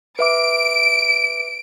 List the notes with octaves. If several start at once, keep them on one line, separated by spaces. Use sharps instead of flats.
B4 E5 D6 D7